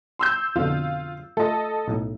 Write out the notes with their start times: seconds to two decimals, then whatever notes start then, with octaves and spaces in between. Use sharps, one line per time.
0.19 C6 E6 G6
0.56 F2 B2 D3 F4
1.37 A3 F4 A4 D#5
1.88 B1 A2